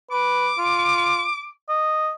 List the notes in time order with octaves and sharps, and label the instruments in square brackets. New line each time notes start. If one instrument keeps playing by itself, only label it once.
[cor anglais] B4 [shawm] D6
[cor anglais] F4
D#5